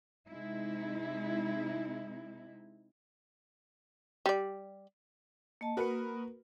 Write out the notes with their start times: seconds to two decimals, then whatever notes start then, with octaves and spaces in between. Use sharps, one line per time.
0.28 C3 G#3 D#4 E4
4.26 G3 D5
5.61 A#3 D#5 A5
5.77 A#3 F#4 A#4 B4 D#6